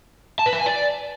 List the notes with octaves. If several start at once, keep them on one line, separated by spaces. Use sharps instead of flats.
A5
B4
E5
G#5
D5